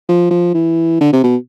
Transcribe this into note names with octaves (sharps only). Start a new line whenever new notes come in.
F3
F3
E3
D3
C3
B2